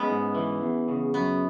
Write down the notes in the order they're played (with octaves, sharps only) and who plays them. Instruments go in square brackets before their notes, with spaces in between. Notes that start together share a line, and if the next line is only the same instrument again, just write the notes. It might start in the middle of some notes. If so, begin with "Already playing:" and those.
Already playing: [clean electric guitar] G#3 [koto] B3 C#4 E4
[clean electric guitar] G#2
E3
E2
C#3
[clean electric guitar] F#2 [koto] B3